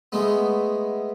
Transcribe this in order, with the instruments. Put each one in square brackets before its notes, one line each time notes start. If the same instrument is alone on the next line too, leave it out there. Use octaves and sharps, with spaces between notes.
[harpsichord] G#3 A3 B3